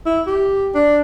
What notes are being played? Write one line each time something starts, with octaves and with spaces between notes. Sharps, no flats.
E4
G4
D4